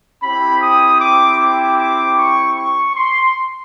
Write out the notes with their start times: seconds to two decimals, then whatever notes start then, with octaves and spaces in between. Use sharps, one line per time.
0.23 C4 E4 G4 B5
0.63 D#6
1.01 D6
1.41 D6
1.79 D6
2.19 C#6
2.58 C#6
2.96 C6